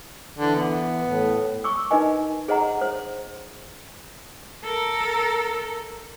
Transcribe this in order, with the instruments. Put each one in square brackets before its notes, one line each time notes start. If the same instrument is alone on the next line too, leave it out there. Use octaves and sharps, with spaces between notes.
[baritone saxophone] D3 [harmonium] E3
[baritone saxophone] B3
[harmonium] A2
[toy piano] C#6 D6 E6
D#4 A#4 B4 D#5 G#5
G#4 C5 D#5 F#5 A#5
C5
[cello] A4 A#4